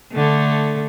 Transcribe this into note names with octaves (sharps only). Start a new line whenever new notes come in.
D3 A3